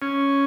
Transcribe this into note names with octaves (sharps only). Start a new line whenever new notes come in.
C#4